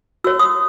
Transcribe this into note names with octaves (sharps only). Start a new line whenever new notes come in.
F#4 C#5 E6
D#6